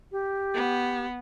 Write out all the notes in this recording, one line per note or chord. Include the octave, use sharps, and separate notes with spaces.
G4
B3